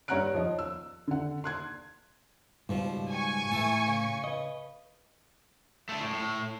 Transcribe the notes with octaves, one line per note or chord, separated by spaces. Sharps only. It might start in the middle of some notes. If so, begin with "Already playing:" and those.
G2 C#5 F#5 A#5 F#6 D7
F3 C#5 D#5
E6
D3 F#5
C6 F#6 G#6
C#2 G#2 B2 F3 G3
G#5 C#6
A2 E3 A4 A5
C#3
B4 D#5
A3 D4
A2
A2